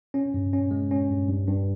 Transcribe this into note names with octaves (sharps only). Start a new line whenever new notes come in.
C#4
G2
C#4
G#3
C#4
G2
G2
G2